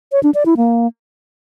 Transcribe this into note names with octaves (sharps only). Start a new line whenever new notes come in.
C#5
D4
D5
E4
A#3